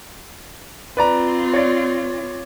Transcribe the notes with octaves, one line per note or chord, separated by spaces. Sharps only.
C4 F4 B4 D5 A#5
C#5 D5